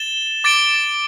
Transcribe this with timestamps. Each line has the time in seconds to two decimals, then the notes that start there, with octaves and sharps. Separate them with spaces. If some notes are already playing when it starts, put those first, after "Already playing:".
Already playing: A6 E7 G7
0.44 D6 A6 D7 G7